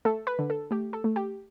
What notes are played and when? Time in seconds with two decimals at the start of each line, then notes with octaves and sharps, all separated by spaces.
0.05 A3 A4
0.27 B4
0.39 D3
0.50 A4
0.71 A3 G4
0.93 A4
1.04 A3
1.16 G4